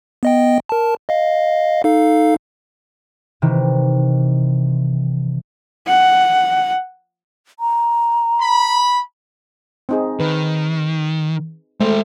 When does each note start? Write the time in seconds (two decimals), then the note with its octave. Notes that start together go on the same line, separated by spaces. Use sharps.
0.23 B3 D#5 G5
0.69 A#4 A5
1.09 D#5 F5
1.84 D#4 A4 F5
3.42 C3 D#3 E3
5.87 F#5
7.60 A#5
8.39 B5
9.89 C4 D#4 G#4
10.20 D#3 B4
11.80 G#3 A3 C5 G5